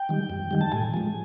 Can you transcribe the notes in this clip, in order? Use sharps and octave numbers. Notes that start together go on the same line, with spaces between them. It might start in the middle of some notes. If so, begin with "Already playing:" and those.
Already playing: G5
D#3 G3
F#2
D#3 G3
A5
A2 G#5
F3 G#3